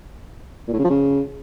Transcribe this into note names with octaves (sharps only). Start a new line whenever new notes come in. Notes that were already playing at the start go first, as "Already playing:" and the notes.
A#2
A2
C#3
F3
C#3